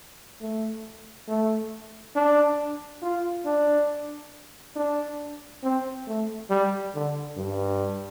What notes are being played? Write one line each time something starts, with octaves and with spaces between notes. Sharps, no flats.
A3
A3
D4
F4
D4
D4
C4
A3
G3
D3
G2